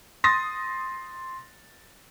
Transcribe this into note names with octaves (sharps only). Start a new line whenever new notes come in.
C6 D#6 A6 A#6